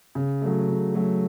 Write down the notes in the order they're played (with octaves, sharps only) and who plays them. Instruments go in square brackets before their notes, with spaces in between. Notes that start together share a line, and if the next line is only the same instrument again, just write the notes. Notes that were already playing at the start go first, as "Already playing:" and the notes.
[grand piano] C#3
F#3 A3
C#3
F#3 A3